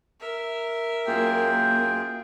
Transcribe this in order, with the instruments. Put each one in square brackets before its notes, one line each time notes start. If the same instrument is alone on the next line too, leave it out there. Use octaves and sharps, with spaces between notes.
[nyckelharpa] A#4 E5
[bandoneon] F#2 F4 G#4 [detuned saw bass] A#3 [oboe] G5